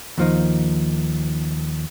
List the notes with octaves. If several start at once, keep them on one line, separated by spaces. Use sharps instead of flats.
D#2 F3 D#4